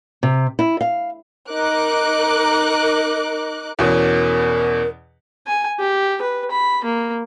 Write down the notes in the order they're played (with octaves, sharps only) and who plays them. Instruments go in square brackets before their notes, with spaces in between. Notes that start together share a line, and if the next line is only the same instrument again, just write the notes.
[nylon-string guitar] C3
E4
F5
[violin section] D#4 A#4 D6 F#6
[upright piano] E2 B2 C#4 [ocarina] A#4
[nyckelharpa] G#5
G4
B4
B5
A#3